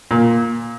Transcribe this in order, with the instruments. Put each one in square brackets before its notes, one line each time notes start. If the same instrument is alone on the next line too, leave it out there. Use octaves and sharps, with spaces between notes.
[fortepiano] A#2